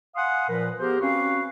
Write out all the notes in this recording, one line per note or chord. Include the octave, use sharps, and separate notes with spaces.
F5 F#5 G#5 C6 D#6
A#2 F3 A#4 B4
B3 G4 G#4 A#4 C5
C4 C#4 F#4 B4 C#5 F5